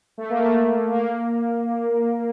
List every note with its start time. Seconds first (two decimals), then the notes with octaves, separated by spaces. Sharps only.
0.18 A3
0.30 A#3
0.40 A3
0.91 A#3